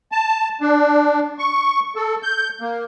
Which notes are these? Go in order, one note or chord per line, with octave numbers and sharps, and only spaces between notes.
A5
D4
C#6
A4
G6
A#3